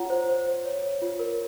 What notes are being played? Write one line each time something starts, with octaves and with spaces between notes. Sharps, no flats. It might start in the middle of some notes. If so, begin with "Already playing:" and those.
Already playing: F4 C#5 F#5 A#5
C5
C5
C5
C#5
C#5
F4
A#4